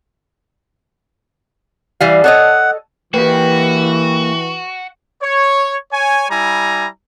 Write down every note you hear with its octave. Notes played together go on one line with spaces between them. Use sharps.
E3 G3 F5
A4 C#5 D#5 F#5
E3 A#3 F#4 G4 B4 G5
C#5
C#5 G#5
G3 E4 G#5 A#5